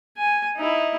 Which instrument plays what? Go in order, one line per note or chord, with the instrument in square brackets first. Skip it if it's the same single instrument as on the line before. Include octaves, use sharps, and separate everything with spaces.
[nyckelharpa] G#5
D#4 E4